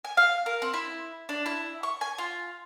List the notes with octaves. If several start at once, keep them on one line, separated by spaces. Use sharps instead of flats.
G#5
F5
A#4
C4
E4
D4
E4
C#6
G#5
F4